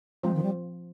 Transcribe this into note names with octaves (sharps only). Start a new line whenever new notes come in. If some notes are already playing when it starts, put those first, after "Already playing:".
F3 G#3 C4 F4 C5
D#3
G3